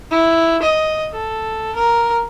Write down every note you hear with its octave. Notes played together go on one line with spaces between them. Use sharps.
E4
D#5
A4
A#4